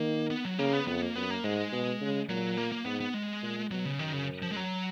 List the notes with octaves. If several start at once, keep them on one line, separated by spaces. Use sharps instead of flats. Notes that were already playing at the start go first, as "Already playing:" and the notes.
Already playing: D#3 A#3
B3
F#3
C#3 A#3
B3
F2 B3
A#3
F#2 B3
A#3
G#2 G#3
B2
C#3
A#2 F#3
A#3
A#3
G#2 B3
B3
G#3
A#2
B2 F#3
C#3
F#2 D#3
C#3
F3
G#3
F#3